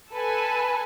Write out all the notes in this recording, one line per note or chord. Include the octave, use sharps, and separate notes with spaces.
A4 B4 G#5